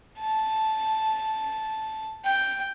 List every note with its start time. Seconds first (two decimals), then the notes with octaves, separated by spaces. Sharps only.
0.20 A5
2.25 G5